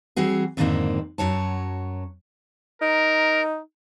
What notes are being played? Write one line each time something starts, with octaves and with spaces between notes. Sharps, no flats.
E3 G3 C4 F#4 G#4
F2 G#2 D3 D#3 A#3 C4
F#2 F#3 C#5 A5
D#4 A#4